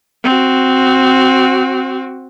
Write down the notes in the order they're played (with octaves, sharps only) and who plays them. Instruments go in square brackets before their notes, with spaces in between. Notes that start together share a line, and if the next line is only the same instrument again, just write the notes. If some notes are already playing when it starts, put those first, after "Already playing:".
[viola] C4 F#4